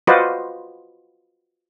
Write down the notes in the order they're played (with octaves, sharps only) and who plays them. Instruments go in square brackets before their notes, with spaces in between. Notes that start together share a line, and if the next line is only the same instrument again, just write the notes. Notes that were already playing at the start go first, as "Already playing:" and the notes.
[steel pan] F4 F#4 B4 C5 D5 D#5